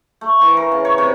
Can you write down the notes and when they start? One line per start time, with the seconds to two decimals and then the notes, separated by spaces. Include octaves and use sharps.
0.21 A3
0.41 E3
0.57 A#4
0.72 C#3
0.85 C#5
0.98 C3